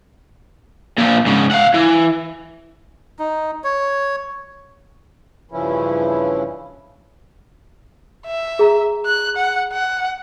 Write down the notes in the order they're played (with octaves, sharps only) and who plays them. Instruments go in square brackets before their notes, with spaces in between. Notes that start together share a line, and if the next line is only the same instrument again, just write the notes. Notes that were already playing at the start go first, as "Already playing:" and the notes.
[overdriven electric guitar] A#2 F3
G#2 C#3
F5 F#5
E3
[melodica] D#4
C#5
[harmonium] G2 C#3 E3 F3 C#4 E4
[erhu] E5
[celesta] G#4 A#5
[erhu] F#6
F#5
F#5